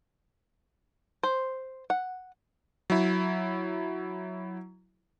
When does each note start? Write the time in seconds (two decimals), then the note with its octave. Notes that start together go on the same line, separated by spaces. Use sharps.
1.23 C5
1.90 F#5
2.90 F#3 E4